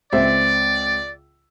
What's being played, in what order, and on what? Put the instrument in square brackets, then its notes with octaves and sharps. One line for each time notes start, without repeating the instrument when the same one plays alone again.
[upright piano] C#2 C4 E5 [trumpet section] D5